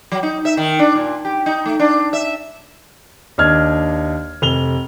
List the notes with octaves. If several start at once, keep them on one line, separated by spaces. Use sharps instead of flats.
F#3
D#4
E5
D#3
D4
A#2
G4
D#4
A3
D4
E5
D#2 D4 D#5 F6 G#6
F1 F7 G7